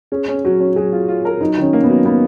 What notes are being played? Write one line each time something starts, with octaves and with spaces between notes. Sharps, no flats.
C#4 G#4
C#4
F#3 F#4
C#4
F#3 G#4
F4
F4
A#4
F#3 D#4
D#3 C#4
A#3
B3
F#3
A#3 B3